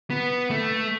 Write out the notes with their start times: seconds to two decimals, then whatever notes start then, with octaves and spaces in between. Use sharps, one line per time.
0.10 B3
0.51 A3